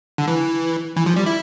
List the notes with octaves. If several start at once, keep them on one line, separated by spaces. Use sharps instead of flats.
D3
E3
E3
F3
G3
E4